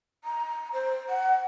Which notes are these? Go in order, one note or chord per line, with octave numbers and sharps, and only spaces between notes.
A#5
C5
F#5